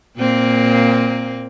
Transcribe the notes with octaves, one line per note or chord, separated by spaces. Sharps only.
A#2 A#3 C4